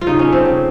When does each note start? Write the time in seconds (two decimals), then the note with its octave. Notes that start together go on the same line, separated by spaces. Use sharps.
0.01 F4
0.07 C#3 D#4
0.19 C#4
0.26 A3
0.32 C4
0.45 C#3